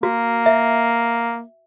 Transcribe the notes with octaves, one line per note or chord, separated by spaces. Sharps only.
A#3 F#4
E5